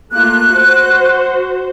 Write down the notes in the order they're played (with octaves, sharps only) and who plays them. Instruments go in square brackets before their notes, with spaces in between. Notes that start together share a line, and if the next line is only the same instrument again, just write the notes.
[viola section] A3 A#3 F4 [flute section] F#6
[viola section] F#4 C5